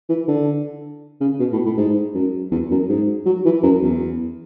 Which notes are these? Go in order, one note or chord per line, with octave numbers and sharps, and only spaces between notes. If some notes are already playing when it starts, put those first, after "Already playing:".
E3
D3
C#3
B2
A2
A2
G#2
F#2
E2
F#2
G#2
F#3
E3
F#2
E2